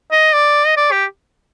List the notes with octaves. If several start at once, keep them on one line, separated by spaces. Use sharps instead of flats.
D#5
D5
D#5
D5
G4